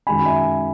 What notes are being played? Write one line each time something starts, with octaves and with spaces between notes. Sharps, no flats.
F#2 D#3 G#3 C#4 G#5 B5
E5 G#5